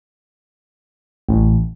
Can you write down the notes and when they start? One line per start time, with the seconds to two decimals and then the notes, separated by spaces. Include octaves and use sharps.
1.29 A1